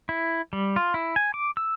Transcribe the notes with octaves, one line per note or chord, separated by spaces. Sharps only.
E4
G3
F4
E4
G#5
D6
E6